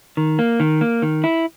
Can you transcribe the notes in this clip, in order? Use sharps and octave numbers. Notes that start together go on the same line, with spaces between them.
D#3
A#3
D#3
A#3
D#3
E4